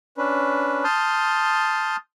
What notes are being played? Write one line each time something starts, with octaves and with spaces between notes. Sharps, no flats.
C#4 D4 B4
A5 C6 D#6 F6 G6